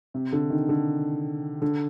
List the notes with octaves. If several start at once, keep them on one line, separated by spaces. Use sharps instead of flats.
C3
D3
D#3
D3
D3